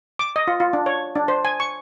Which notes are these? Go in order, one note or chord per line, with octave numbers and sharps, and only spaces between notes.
D6
D#5
F4
F4
D4
C#5
D4
C5
G#5
C#6